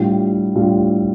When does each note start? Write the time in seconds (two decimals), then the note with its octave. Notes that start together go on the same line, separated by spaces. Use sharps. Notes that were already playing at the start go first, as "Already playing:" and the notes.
Already playing: A2 G3 D4 F4
0.55 A2 G3 D4 F4